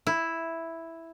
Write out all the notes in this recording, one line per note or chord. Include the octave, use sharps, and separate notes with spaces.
E4